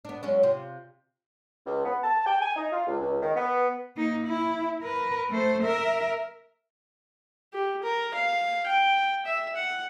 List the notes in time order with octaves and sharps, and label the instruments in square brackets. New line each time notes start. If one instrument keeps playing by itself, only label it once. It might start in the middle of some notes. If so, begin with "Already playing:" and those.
[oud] B3 D4
F#3 G#3 C#4
C3 F4
[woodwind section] C#2
B3
A5
G5
G#5
D#4
F4
C#2
C#2
D#3
B3
[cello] A#3 D#4
E4
A#4 B4
A3 C5
A#4 E5
[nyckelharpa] G4
A#4
F5
G5
E5
F#5